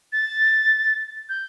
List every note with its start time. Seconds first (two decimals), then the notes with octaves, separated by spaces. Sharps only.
0.13 A6
1.29 G6